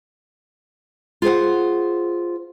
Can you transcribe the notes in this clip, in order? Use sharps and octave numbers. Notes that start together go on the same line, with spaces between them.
F4 G#4 C5 F#5